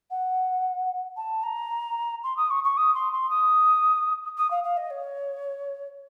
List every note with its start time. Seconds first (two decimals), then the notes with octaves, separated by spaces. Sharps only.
0.10 F#5
1.16 A5
1.43 A#5
2.23 C6
2.37 D#6
2.50 C#6
2.64 C#6
2.77 D#6
2.94 C6
3.12 C6
3.30 D#6
4.37 D#6
4.50 F5
4.64 F5
4.77 D#5
4.90 C#5